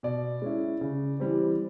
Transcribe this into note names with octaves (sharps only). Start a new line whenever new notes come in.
B2 D5
G#3 C#4 E4
C#3
E3 G3 C4